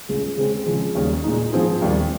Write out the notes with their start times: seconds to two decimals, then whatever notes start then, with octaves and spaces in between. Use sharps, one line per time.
0.09 C#2 C#3 G#3
0.37 C#3 G#3 C4
0.66 C#3 F3 G#3
0.95 D#2 C#3 G3 C#4 G#4
1.24 A#2 G#3 D#4
1.52 G#2 F3 C4 F4 G#4
1.81 D#2 D#3 G3 A#3